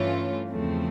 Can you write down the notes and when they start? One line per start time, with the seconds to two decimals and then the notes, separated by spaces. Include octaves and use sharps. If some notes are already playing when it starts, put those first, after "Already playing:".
Already playing: G2 E3 A3 C#4 F4
0.49 E2 C#3 F3 A3 C4